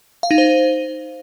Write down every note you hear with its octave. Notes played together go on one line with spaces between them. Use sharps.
F5
D#4
C5